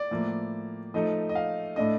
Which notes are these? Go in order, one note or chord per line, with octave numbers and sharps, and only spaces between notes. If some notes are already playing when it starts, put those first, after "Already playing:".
Already playing: D5
A2 F3 A#3
F3 A3 D#4 D#5
D#5
F5
A2 A3 D4 D#5